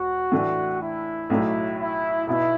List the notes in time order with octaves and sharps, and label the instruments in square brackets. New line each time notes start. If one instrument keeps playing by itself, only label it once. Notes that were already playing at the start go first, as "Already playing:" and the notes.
Already playing: [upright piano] E1 [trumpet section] F#4
[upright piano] A2 E3 A3 D4
[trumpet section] E4
[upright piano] B1 A2 F#3 A3
[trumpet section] E4
[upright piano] B1 B2 B3 [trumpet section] E4